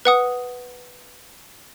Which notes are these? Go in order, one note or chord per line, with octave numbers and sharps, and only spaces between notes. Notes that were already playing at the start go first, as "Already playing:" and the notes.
B4 F#5 D#6